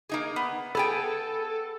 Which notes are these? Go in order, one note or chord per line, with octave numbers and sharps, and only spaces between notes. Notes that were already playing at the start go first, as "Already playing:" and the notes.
A#3 D#4 G#4
B3
B3 G#4 A4 G5